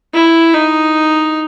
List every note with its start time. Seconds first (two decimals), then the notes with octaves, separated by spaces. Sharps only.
0.14 E4
0.54 D#4